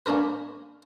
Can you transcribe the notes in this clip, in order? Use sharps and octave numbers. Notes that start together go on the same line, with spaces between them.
A#3 C#4 D4 A#4 B4